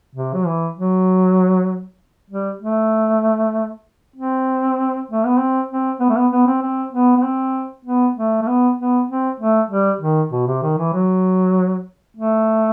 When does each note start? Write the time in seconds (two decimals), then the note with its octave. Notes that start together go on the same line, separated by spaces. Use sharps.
0.15 C3
0.34 F#3
0.46 E3
0.77 F#3
2.30 G3
2.62 A3
4.16 C4
5.11 A3
5.26 B3
5.39 C4
5.70 C4
6.00 B3
6.10 A3
6.16 B3
6.32 B3
6.47 C4
6.62 C4
6.93 B3
7.17 B3
7.23 C4
7.85 B3
8.16 A3
8.42 A3
8.47 B3
8.78 B3
9.09 C4
9.40 A3
9.70 G3
10.01 D#3
10.32 B2
10.47 C3
10.63 D#3
10.78 E3
10.93 F#3
12.17 A3